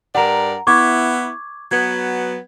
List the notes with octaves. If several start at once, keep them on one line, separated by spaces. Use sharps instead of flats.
G2 A#4 D5 F#5 A#5
B3 E4 C#6 D6 G#6
F#3 B3 G#6